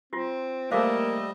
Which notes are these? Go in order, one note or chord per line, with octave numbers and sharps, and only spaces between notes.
C4 F4 F#4
G3 A3 A#3 C5 D#5 F5 D6